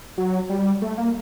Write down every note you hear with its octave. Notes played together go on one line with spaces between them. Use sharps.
F#3
G3
A3
A#3